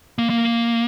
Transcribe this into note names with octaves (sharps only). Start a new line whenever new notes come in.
A#3
A#3